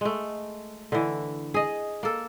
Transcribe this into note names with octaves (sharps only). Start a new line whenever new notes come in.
G#3 A3
D3 E3
G#4 D#5
A#3 A4